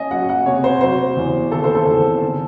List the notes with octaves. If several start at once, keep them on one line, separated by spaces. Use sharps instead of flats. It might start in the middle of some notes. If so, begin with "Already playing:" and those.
Already playing: C#4 D#5 G#5
F#3 F#5
F#5
C3 C#5
C5
F#3 C5
E2
D#3 A4
C5
A4
E2
D#3